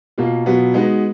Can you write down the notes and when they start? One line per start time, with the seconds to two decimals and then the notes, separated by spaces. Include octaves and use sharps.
0.18 B2 A#3 F4
0.46 B2 F#3 B3 F4
0.74 G#3 B3 D#4 F#4 B4